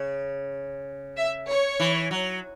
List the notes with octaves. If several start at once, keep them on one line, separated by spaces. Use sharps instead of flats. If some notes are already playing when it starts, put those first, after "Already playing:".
Already playing: C#3
E5
C#5
E3
F#3